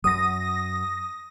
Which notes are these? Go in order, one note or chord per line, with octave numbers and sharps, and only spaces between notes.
F#2 F#3 D#6 A#6